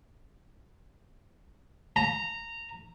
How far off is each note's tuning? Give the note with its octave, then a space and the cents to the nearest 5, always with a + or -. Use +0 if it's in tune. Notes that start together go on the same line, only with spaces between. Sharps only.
A#5 -15